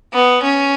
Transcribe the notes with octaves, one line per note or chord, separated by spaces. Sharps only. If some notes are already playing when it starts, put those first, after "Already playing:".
B3
C#4